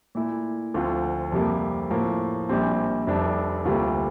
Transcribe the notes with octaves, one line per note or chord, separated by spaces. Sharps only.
A#2 A3 E4
D2 D3 F3 C4 F4
F2 C3 G3 A#3
A2 F3 A#3
A#1 A#2 G3 C4
F1 F2 C3 G3 D4
D2 C3 G3 A#3 F4